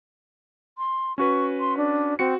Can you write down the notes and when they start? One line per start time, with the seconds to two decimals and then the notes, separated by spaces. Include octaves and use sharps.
0.78 C6
1.18 C#4 F#4 B4 C#6
1.60 C6
1.77 D4
2.19 C4 F#4 C#7